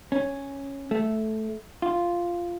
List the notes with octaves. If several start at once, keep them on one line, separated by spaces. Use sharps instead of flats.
C#4
A3
F4